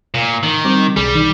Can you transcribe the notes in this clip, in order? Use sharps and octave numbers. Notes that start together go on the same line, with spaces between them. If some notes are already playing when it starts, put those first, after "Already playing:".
A#2
D#3
G3 C4 D6
B1 G3 G#4
D#3